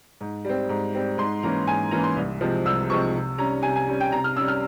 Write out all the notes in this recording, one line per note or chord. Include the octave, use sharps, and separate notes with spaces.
G#2
G3 C4
G#2
G3 C4
G#2 C6
E3 A#3 C#4 A#5
G#2 G#5
E3 A#3 C#4 A#5
C6
C2
C3 F3 G#3 C4
C2 E6
C3 F3 G#3 C4 C#6
C3
G3 C#4 A#5
C3 G#5
G#5
G3 C#4
G5
C3 A#5
F6
G3 C#4 E6
F6